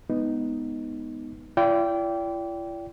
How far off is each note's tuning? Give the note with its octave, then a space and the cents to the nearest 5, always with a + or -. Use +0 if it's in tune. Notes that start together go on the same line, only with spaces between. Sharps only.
G#3 +0 B3 +0 D#4 +0
E4 +45 D5 -30 G5 -10